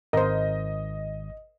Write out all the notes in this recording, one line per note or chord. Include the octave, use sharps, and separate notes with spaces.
G#1 A#4 C5 D#5